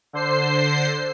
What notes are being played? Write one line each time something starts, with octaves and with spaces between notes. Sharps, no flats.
D3 C5 C7